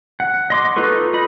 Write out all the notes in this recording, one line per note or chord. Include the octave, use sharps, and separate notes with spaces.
F#5
D#5 C6 D6
D#4 F4 A4 B4 C#6
D#4 D#5 B5